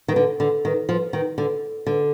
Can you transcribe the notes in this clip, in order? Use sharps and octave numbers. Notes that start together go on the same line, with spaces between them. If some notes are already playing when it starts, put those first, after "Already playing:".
D#3
D3
D3
D#3
F3
D#3
D3
D3